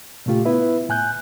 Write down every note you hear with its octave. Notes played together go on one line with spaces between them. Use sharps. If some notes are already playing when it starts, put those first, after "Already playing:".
A#2 C#3 A3 F4 G4
B3 E4 B4 E5
A2 G#5 F#6 G6